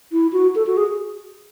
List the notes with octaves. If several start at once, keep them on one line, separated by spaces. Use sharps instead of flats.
E4
F#4
A4
F#4
G#4